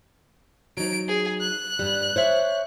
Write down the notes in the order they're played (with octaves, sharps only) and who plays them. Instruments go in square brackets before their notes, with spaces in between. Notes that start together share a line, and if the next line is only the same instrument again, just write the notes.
[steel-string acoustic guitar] F#3 D#4 [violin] D7
[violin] G#4
F#6
[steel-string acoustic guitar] G2 G3
C5 C#5 E5